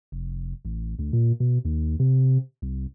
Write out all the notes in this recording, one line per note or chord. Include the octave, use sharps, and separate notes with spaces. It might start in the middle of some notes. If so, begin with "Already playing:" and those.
F1
A1
D2
A#2
B2
D#2
C3
C2